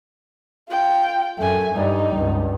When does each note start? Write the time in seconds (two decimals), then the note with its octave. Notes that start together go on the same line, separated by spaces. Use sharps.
0.69 F4 G5
1.38 F#2 A3 G#5
1.74 G2 G3 D#4
2.16 C#2 G2